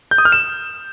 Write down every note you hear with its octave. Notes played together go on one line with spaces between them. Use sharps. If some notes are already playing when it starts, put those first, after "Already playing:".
G6
D#6
F6
E7